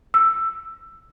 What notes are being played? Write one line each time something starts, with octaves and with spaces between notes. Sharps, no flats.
E6